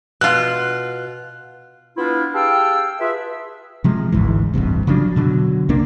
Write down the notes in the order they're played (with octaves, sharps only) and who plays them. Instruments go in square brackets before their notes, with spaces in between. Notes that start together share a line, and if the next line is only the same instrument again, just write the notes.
[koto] B2 F4 [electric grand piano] F#6
[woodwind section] B3 D4 E4 F4
G4 G#4 F5 G5 A5 E6
F4 G#4 B4 E5
[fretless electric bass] C3 F3 G#3
G#1 D2 G#2 E3
D1 A1 G2 C3
C#3 F3 F#3 D4
B2 D3 E3 F#3
C2 C3 A#3 D4